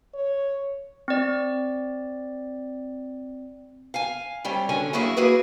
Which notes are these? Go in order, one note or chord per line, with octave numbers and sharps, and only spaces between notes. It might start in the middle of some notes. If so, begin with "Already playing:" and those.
C#5
C4 D5
F5 G#5
C3 G3 C#4
D2 D3 F#3 C#4 G#5
F#3 A#3 E4 F#4 G#4 E5
A#3 E4 F#4 G#4 B4